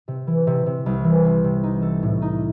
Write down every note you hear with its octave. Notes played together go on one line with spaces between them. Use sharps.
C3
E3
C3
C3
C2
E3
C4
C3
D#4
A4
A2
D#4